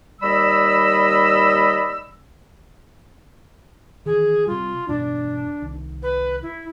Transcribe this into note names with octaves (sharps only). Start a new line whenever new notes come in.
D#2 G3 D5 D#5 B5 E6
D#3 E3 G#4
C3 G3 F4
E2 G2 B2 D4
C2 D#3
B4
E4